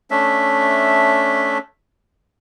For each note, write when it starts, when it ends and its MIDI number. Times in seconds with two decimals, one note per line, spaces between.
0.11 1.58 57
0.11 1.58 61
0.11 1.58 62
0.11 1.58 76